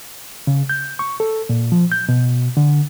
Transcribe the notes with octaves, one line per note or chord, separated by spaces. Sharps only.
C#3
G6
C#6
A4
A#2
F3
G6
B2
D3